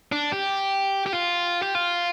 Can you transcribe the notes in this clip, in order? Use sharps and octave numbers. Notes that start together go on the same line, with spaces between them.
D4
G4
G4
F4
G4
F4